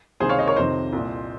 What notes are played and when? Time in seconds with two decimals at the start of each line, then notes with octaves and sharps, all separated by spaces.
0.20 C#2 C3 D#3 G#4 C5
0.29 C#5 F5
0.39 C5 D#5
0.47 A#4 C#5
0.56 F2 C3 D#3 C5 D#5
0.93 C2 A#2